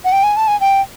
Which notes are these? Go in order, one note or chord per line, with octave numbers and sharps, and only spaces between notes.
F#5
G5
G#5
A5
G#5
G5